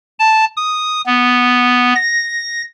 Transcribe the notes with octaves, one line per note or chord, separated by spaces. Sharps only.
A5
D#6
B3
A#6